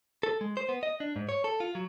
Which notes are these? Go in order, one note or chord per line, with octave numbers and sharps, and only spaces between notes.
A4
G#3
C5
B3
D#5
D4
G#2
C#5
A4
F4
F#3